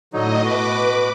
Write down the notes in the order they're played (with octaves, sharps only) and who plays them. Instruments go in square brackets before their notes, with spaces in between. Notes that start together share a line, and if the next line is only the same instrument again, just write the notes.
[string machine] A2 D#5 [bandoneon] D3 F#3 D#4
[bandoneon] B2 F#4 [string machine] B4 D6